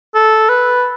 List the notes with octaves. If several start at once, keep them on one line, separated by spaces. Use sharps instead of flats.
A4
B4